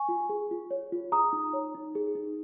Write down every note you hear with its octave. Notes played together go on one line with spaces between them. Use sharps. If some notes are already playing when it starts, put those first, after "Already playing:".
Already playing: G#5 C#6
F4
G#4
F4
C#5
F4
G#4 A#5 D#6
D#4
C#5
D#4
G#4
D#4